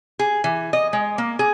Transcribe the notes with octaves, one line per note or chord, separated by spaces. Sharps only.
G#4
E3
D#5
G#3
A#3
G#4